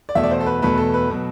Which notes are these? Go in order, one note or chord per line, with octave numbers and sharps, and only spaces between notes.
D5
E2 B2 A3 E5
D5
C5
A4
B4
E2 B2 A3 B4
A4
B4
B2 F#3